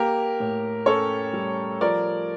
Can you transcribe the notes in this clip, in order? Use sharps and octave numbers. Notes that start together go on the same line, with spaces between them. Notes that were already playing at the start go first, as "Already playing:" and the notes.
Already playing: A#3 G4 A#4
A2
C#4 A4 C#5
G3
F3 A#4 D5